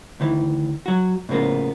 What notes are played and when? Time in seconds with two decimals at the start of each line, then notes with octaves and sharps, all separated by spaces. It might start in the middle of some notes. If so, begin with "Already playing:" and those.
0.20 D2 D#3 E3
0.86 F#3 F#4
1.29 A2 C#3 F3 A#3 B3